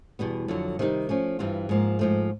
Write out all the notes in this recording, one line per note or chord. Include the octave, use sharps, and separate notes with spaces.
E2 B2 G3 B3
F2 D3 F#3
C3 D#3 G3 B3 D#4
F3 A3 C#4
G2 E3 G3 C4 F4
G#2 F3 A#3
G#2 F3 A3